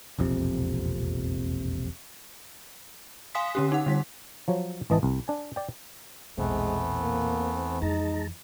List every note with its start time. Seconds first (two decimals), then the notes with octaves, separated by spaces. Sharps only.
0.19 E1 A#1 F2 C3
3.35 F5 G#5 C6 D#6 B6
3.55 D3 C#4 G4
3.72 D#4 F#5
3.86 D3 G3 B6
4.48 F3 F#3 C#5
4.90 G#1 E3 D#5 A5
5.03 C2
5.28 D4 G#5
5.56 D5 G5
6.38 A#1 E2 B2 E3 G#3 A3 B3 C4
7.02 A#3
7.82 F2 E3 G#3 D#4 A5 A#5